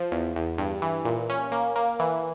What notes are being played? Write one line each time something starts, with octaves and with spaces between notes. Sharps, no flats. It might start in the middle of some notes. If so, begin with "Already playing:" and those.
Already playing: F3
E2
E2
G2
E3
A#2
C#4
A#3
A#3
E3